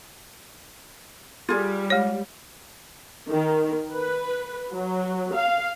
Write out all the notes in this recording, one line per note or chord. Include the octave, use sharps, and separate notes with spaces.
G3 F4 G#4
G#3 C#5
D#3
B4
F#3
F5